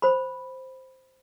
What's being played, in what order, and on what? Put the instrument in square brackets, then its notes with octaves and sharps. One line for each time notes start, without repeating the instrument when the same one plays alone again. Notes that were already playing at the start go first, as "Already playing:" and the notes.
[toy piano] C5 B5